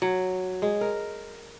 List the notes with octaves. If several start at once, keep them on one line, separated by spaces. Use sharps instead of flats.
F#3
G#3
A#4